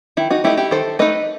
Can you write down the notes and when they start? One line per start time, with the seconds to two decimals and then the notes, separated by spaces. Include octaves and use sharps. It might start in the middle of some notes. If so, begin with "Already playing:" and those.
0.17 D#3 E4
0.30 D#4 F#4
0.44 A3 D#4 E4 G4
0.57 E4 G4
0.71 D#3 A4 C5
0.99 A3 D#4 B4 D#5